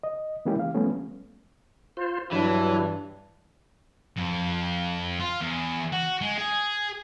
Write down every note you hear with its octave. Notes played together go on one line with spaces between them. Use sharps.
D#5
E3 G#3 A#3 C#4 E4 G4
F5
F3 G3 A3 B3 C#4
F4 C5
G2 E3 F#3 D4 E4
F2
F4
E2
F#4
G#3
G#4